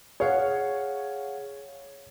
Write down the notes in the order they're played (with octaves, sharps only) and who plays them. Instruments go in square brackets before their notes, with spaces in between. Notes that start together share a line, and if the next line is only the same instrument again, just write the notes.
[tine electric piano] G#4 F5 F#5 [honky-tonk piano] C#5